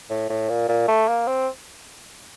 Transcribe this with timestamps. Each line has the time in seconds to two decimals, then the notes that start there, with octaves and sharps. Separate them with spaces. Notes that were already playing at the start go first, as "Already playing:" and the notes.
0.10 A2
0.29 A2
0.49 A#2
0.68 A#2
0.88 A3
1.08 A#3
1.27 C4